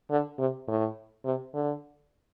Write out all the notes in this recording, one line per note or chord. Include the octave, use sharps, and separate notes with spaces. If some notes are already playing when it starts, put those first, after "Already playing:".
D3
C3
A2
C3
D3